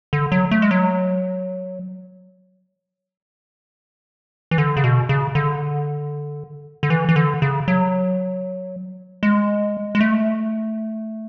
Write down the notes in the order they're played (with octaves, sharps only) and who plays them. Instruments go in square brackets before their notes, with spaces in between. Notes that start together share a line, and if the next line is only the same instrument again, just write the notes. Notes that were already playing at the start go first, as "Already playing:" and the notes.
[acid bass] D3
F#3
A3
G#3
F#3
E3
D3
C#3
B2
C#3
D3
D3
E3
E3
D3
C#3
F#3
G#3
G#3
A3